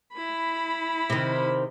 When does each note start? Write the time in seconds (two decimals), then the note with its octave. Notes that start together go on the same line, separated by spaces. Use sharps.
0.14 E4 B5
1.10 C3 D#3